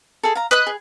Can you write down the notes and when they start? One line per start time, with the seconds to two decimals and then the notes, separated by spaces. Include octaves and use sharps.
0.23 G#4 A4
0.35 F5 A#5
0.51 B4 D#5 D#6 F#6
0.67 G#4